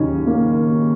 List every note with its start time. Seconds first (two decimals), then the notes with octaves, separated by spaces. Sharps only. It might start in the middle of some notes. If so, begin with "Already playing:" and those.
Already playing: D#2 C#3 F#3 C#4 D#4
0.27 A#3